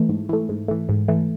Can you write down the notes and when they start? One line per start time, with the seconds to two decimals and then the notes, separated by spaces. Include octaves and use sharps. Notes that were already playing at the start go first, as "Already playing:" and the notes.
Already playing: E3 A3
0.09 G#2
0.29 E3 A3
0.49 G#2
0.68 E3 A3
0.89 G#2
1.08 E3 A3